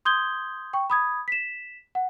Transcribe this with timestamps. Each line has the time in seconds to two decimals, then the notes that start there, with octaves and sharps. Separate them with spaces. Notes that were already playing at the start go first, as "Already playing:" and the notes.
0.05 C6 D#6 G6 G#6 G7
0.73 G5 C#6
0.90 B5 D#6 G#6
1.28 B6 E7
1.95 F#5